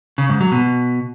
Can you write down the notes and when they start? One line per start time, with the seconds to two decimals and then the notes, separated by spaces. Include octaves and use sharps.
0.18 C#3
0.29 G#2
0.41 F#3
0.52 B2